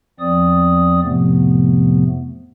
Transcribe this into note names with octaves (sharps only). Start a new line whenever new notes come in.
E2 F3 C4 D5 D#6
F2 A2 C3 F3 A3 B3